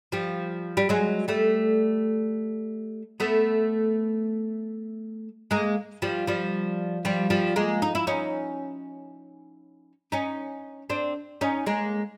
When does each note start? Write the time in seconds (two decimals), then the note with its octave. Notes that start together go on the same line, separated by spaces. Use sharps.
0.12 F3 G3
0.77 G3
0.89 F#3 G#3
1.28 G3 A3
3.20 A3 B3
5.51 G#3 A#3
6.02 F3 G3
6.27 F3 G3
7.05 F3 G3
7.30 F3 G3
7.56 G#3 A#3
7.82 D#4
7.95 E4
8.07 C#4 D#4
10.12 C#4 D#4
10.90 C4 D4
11.41 C#4 D#4
11.66 G#3 A#3